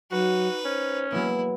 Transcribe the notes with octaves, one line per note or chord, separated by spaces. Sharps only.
F#3 D#4 F#4 B4
C#4 C5
F#3 G#3 A#3 B3 E4